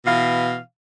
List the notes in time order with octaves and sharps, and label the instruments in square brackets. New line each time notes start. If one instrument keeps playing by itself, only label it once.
[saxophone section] B2 E3 F5